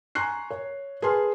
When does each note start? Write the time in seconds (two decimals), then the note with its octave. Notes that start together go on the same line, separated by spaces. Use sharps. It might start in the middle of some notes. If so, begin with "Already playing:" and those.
0.15 G#5 A#5 C6 C#6 F#6 C7
0.51 C#5
1.02 G#4 B4 A5 C6 F6